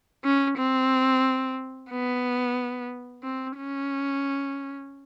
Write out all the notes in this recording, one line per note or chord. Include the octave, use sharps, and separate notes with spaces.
C#4
C4
B3
C4
C#4